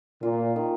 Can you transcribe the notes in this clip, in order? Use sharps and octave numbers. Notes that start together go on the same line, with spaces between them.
A#2 F4
D#3